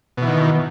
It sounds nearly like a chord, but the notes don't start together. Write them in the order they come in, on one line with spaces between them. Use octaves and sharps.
B2 E3 D#3